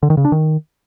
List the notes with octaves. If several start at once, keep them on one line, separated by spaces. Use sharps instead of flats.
D3
D#3
C#3
D4
D#3